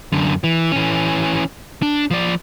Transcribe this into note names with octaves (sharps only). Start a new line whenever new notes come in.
F#2 D3
E3
E3 C#4
D4
F3 D5